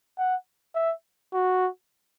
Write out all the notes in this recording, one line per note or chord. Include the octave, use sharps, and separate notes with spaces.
F#5
E5
F#4